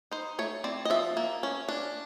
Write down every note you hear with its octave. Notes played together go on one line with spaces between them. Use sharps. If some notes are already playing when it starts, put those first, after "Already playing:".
D#4 C5
A3 C#5
C4 D5
D#5
F3 E5
A#3
C#4
D4